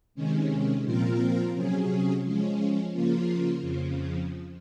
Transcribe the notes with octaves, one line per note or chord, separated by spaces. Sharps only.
C3 D#3 G#3 C#4
A#2 F3 C4 F4 A#4
C3 F#3 C#4 G#4
F3 G#3 C#4
C#3 F3 A#3 F4
F2 C#3 F3